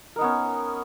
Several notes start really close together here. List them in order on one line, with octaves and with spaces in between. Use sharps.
A#4 D#4 B3 C#4